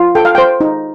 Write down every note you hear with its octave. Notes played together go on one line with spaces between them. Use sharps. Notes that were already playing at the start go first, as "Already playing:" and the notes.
Already playing: F4
A4 G5
F5
C5 G5
D#4